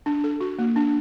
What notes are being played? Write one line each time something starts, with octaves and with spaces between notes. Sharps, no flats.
D4
A4
F#4
A#3
D4